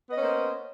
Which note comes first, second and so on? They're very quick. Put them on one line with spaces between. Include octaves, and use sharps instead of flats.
B3 D#5 C#4 A#3 C5